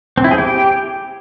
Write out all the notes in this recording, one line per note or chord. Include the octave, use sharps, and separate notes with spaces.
C4
E4
G#4
G4